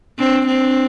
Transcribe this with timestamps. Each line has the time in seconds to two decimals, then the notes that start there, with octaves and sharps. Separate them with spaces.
0.19 C4 D4
0.46 C4 D4